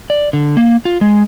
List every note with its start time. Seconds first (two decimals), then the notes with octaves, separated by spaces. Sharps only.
0.10 D5
0.33 D3
0.57 A#3
0.85 F4
1.01 G#3